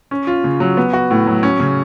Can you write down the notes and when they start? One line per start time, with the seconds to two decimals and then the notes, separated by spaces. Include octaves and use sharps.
0.11 C#4
0.27 F4
0.44 C#3
0.60 F#3
0.77 B3
0.93 F#4
1.11 A2
1.27 F#3
1.43 C#4
1.60 C#3